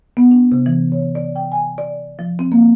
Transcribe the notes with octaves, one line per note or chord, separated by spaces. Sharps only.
B3
D4
C3
E3
C#5
D5
G5
G#5
D5
F3
C4
A#3